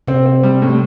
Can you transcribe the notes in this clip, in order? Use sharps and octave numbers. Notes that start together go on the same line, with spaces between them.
C3 C4
C4
G3
A2